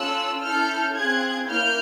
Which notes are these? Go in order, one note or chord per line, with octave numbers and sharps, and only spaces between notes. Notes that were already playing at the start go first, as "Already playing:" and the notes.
Already playing: C#4 F4 A4 E6 F#6
C#4 E4 A4 F6 G6
C4 F4 G#4 F#6 G#6
A#3 C#4 E4 F6 G6